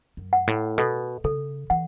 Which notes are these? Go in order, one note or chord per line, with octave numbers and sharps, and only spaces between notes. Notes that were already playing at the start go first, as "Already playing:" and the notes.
F#2
F#5
A2
B2 A4
C#3 A4
E3 F#5